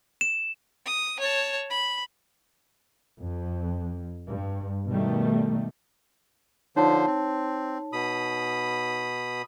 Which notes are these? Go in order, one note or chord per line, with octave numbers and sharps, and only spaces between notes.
E7
D#6
C#5 A5
B5
F2
G2
B2 D#3 G3 A3
D3 F3 D#4 C5 C#5 A5
C4
B2 B5 D#6